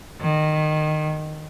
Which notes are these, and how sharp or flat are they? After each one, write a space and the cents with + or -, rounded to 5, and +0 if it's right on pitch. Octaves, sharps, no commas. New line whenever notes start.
D#3 -15